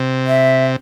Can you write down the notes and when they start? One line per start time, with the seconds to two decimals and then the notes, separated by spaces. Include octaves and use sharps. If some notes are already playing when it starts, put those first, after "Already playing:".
Already playing: C3
0.27 E5